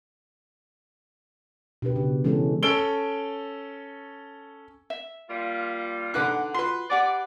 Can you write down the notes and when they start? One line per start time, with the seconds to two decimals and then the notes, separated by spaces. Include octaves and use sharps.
1.82 B2 D4 G4 B4
1.96 C#3
2.24 E3 G#3 C#4 A4
2.63 C#4 A4 E6 D7 G7
4.90 E5
5.30 G3 A#3 F4
6.14 D3 D#4 B4 F#5 D6 F#6
6.54 F4 F#4 B4 C6
6.90 G4 D5 F#5 G#5